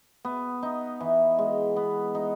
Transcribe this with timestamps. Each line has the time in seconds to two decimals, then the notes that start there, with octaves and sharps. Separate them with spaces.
0.25 B3
0.63 D#4
1.00 E3
1.39 G#3
1.76 B3
2.15 D#4